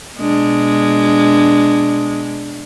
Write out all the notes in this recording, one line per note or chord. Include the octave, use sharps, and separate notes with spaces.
B2 G#3 D4